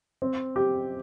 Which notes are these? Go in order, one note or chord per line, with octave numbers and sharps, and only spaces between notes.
C4
G4